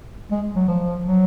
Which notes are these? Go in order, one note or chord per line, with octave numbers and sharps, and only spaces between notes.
G#3
F#3
F3
F#3